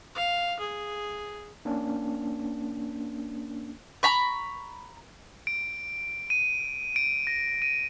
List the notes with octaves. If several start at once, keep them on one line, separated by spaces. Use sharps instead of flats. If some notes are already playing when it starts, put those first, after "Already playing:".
F5
G#4
A#3 C#4 D4
A#5 B5 C#6
D7
D#7
D7
A#6
D#7